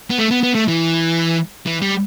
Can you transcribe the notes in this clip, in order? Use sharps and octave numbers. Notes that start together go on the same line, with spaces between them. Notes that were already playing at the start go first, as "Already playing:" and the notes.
B3
A3
B3
B3
A3
E3
E3
G3